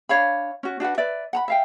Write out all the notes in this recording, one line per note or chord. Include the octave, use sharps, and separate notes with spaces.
D4 C#5 F5 B5
C#4 F#4
D4 F#4 B4 F#5
B4 D5 E5
F#5 A#5 B5
E5 F5 G5